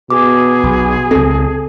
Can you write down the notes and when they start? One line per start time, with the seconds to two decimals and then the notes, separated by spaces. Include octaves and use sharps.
0.10 B2 G#4 D6
0.63 B1
1.11 C#2 C4 A4